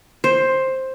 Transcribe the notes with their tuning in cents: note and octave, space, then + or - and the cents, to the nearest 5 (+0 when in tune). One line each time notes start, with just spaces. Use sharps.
C5 +10